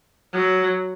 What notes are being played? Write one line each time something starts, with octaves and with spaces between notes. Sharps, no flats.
F#3